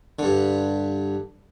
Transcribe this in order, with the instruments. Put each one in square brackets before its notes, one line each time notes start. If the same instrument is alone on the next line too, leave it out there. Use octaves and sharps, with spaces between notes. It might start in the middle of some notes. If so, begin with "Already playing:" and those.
[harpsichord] G2 D3